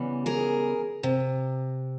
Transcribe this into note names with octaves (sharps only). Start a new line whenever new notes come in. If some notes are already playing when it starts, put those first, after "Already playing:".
Already playing: C#3 E3 G3 B3
G#4 A#4
C3